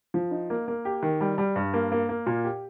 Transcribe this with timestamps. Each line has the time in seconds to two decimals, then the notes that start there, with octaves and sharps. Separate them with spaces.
0.14 F3
0.31 D#4
0.50 A#3
0.68 A#3
0.85 G4
1.03 D#3
1.21 G3
1.38 G3
1.56 G2
1.74 A#3
1.92 A#3
2.09 A#3
2.26 A#2
2.45 G4